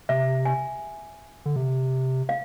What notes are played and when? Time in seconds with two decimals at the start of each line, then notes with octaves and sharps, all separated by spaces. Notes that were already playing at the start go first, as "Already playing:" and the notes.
0.09 C3 E5
0.45 G#5
1.45 D3
1.56 C3
2.29 F5